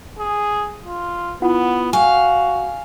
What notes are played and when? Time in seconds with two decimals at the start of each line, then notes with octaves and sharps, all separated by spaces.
0.19 G#4
0.85 F4
1.42 B3 E4 F4 F#5
1.93 F#4 F5 G#5